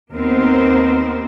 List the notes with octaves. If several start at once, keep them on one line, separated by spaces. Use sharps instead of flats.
D#2 B3 C4 A#4 C5